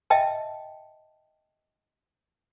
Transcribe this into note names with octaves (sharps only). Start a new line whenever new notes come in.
D#5 E5 G5 A5